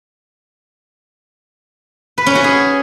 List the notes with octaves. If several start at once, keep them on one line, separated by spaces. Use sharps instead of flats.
B4
C#4
F#4
G#4